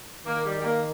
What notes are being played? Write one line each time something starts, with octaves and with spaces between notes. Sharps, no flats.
D#3 A#3
G3
G3
A#3